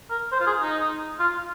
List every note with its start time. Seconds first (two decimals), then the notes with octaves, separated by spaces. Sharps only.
0.10 A#4
0.32 C5
0.40 F4
0.47 G#4
0.61 D#4
1.19 F4